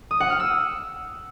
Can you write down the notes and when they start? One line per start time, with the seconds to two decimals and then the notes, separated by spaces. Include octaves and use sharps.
0.11 D#6
0.20 F#5
0.30 F6
0.40 E6